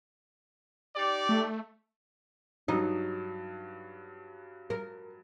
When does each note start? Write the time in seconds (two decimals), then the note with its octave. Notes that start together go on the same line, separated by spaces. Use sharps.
0.95 D#4 G4 D5
1.29 A3
2.68 G2 F#3 D#4 D#6
4.70 A#4